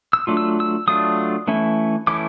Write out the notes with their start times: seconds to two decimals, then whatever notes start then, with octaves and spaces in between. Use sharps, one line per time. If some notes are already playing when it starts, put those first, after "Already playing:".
0.13 E6
0.27 F#3 A3 D4 F4
0.37 E6
0.60 E6
0.87 F#3 A3 D4 F4 D#6
1.48 E3 A3 C#4 E4
2.07 E3 A3 C#4 E4 D6